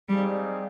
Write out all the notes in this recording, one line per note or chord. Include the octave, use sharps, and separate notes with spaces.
G3 C4 D#4 G#4 D5 F5